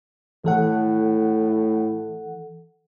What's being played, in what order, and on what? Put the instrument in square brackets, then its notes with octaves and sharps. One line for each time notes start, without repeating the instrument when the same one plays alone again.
[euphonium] A2 [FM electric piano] E3 A4 F#5